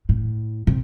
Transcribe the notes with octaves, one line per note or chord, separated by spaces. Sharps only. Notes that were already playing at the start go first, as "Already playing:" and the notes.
A2
C3